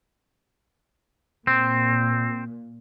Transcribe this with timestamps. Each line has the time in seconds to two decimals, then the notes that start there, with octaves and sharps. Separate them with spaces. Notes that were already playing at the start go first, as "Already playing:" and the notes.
1.47 A#2 C4